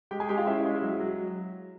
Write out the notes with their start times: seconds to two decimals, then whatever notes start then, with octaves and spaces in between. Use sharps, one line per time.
0.11 G#3 G4 G5
0.20 G#4 G#5
0.29 G#3 G4 G5
0.38 F4 F5
0.47 C#4 E4 E5
0.65 G#3
0.82 F#3
1.00 F#3